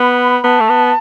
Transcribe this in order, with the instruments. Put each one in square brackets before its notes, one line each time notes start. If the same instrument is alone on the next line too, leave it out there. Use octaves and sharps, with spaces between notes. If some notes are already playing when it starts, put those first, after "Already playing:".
Already playing: [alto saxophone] B3 [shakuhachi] B5
[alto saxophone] B3 [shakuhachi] A5
[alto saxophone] A3
B3